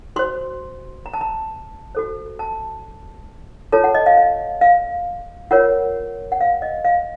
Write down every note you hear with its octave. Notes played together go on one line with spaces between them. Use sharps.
F#4 C5 C6
A#5
A5
A#5
F#4 A4 C5
A5
F4 A4 C#5 A5
F#5
D#5
F5
F5
F5
F4 A#4 C#5 F#5
F#5
F5
D#5
F5